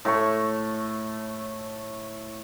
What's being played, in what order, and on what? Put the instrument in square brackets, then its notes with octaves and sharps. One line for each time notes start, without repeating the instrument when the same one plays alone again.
[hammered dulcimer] A2 A3 C#6